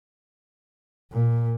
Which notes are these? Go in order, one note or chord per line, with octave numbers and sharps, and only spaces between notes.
A#2